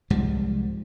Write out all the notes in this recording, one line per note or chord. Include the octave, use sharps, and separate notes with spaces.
C2 G#2 F3 G3